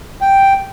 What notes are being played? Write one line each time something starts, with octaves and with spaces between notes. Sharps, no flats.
G5